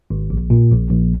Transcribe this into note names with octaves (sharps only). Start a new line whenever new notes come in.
G#1
A#1
A#2
A#1
A#1